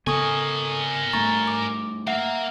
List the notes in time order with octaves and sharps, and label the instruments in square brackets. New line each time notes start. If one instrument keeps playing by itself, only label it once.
[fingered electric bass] C#3 B3 [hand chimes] A4 C#6 D#6 [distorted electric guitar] A#4 G#5
[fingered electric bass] G2 A3 [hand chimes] A#5 C#6 A6
[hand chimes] D6
[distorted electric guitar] A#3 [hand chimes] E5 F#5